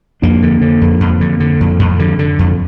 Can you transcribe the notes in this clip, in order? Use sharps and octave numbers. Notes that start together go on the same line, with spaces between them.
F2 A#3 D4
D3
D3
F2
F2
D3
D3
F2
F2
D3
D3
F2